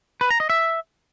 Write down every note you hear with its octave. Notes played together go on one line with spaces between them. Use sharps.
B4
A#5
D#5
E5